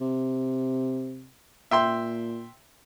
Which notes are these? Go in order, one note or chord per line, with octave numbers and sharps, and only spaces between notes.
C3
A#2 E5 G5 C6